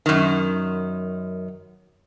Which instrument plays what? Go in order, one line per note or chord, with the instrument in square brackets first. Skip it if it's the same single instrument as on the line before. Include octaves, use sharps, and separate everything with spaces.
[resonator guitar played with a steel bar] F#2 D#3